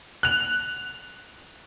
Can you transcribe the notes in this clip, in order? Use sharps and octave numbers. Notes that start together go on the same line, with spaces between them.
F#6 F7